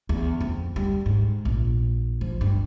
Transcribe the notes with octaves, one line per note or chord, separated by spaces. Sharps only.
E2
F2
G3
G#2
A#1
F3
G2